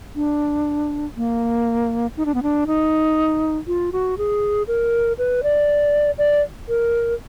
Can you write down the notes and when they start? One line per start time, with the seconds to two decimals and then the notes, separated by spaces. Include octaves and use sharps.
0.15 D4
1.17 A#3
2.17 D#4
2.26 D4
2.34 B3
2.43 D4
2.67 D#4
3.67 F4
3.92 F#4
4.18 G#4
4.68 A#4
5.18 B4
5.43 D5
6.18 D5
6.69 A#4